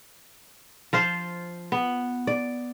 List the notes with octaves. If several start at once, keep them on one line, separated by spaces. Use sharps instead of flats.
F3 F4 C5
B3
D5